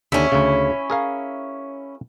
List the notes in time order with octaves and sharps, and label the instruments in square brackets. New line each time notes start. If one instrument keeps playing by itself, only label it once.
[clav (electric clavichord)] D#2 D3 [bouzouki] C#4 E4
[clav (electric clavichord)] D2 C#3
G#4 A#4 F5